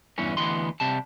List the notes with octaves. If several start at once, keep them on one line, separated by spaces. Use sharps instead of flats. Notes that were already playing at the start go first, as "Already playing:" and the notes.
E2 G2 E3 C#4
D2 E3 B3 D#5 C6
C3 G3 A5